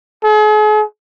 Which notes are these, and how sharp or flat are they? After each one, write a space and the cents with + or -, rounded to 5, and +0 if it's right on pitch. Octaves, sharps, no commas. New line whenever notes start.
G#4 +40